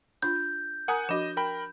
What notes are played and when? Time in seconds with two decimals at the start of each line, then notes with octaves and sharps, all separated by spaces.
0.23 D4 F4 G6
0.88 A#4 F#5 G#5 A#5 D#6
1.09 F3 D4 F#4 D#5 E7
1.37 A#4 G5 B5